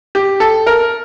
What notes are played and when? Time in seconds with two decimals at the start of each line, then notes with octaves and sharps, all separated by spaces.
0.15 G4
0.40 A4
0.67 A#4